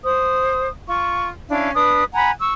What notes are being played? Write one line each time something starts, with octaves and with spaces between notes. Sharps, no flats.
C5 D#6
F4 C#6
C#4 D4 E4 F5
D4 B4 D#6
F#5 G#5 A#5 B5
C#6 E6